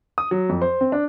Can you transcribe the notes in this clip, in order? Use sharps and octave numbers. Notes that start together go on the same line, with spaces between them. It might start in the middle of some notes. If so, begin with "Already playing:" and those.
D#6
F#3
F2
C5
C4
D4